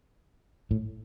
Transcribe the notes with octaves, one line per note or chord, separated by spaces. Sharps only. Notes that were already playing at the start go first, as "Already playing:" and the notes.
A2